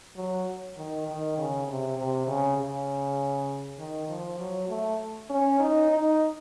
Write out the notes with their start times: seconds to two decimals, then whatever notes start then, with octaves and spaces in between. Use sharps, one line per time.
0.16 F#3
0.77 D#3
1.08 D#3
1.38 C#3
1.68 C3
1.98 C3
2.27 C#3
2.57 C#3
3.79 D#3
4.08 F3
4.39 F#3
4.69 A3
5.30 C#4
5.59 D#4
5.90 D#4